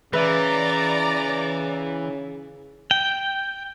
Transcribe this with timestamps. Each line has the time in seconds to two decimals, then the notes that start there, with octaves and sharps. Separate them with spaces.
0.13 C#3 E3 B4 D5 E5 A#5
2.91 G5